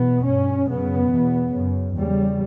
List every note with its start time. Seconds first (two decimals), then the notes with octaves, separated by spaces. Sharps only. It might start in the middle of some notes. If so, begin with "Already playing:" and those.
Already playing: E2 B2 B3
0.24 G2 C#4
0.67 F#2 C#3 B3
1.10 E2 B2
1.53 F#2 C#3
1.96 E2 C#3 G3